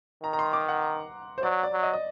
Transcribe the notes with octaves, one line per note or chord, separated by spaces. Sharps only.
D#3 A#5
A#5
C6
D6
F#5
C5
F#3 D5
D5
F#3
D#5
D#5